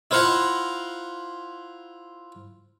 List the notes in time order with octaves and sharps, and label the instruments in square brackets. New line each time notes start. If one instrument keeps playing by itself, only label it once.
[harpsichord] E4 F4 C5 F5 F#5 A#5